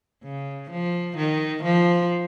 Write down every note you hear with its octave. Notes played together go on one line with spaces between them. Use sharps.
C#3
F3
D#3
F3